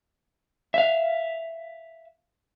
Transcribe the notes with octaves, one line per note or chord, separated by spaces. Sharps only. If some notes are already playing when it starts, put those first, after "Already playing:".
E5 F5